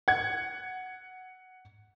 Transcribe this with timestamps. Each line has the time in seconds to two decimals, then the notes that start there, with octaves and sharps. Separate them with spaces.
0.08 F#5 G#6